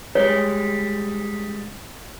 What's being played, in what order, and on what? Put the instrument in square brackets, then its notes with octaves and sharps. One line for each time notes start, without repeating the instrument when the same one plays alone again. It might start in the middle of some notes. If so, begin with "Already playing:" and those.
[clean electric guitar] G3 G#3 [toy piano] C#5